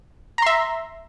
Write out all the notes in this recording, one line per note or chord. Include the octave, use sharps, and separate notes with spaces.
E5 A#5 C6